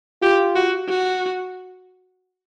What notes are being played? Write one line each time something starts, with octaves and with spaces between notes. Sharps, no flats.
F4 G4
F#4
F#4